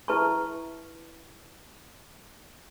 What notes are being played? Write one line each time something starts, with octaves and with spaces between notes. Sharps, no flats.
E4 B4 E5 A5 A#5 C#6